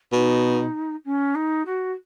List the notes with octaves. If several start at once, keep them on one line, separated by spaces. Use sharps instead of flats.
B2 D#4
C#4
D#4
F#4